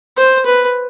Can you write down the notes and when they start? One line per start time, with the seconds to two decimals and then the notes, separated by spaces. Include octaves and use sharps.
0.18 C5
0.46 B4